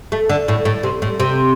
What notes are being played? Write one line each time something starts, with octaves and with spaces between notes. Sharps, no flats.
A3
D3
A2
A2
C3
A2
C3